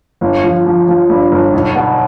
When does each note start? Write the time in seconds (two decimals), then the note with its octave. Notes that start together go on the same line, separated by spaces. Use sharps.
0.21 G1
0.44 F3
0.66 F3
0.88 F3
1.09 G2
1.32 G1
1.53 B1
1.75 B2